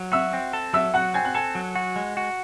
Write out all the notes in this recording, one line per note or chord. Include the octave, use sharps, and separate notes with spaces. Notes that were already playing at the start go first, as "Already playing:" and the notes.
Already playing: F#3
F#4 E5 E6
C4
A4
F#3 E5 E6
F#4 F#5 F#6
C4 G#5 G#6
F#6
A4 G#5 G#6
F#3
F#4
G#3
F#4